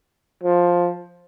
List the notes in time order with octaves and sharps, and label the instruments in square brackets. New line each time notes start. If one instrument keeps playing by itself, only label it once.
[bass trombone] F3